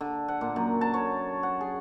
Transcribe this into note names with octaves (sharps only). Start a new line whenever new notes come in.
D3
F#5
A#2
F#2
A5
C#5
F#5
G#4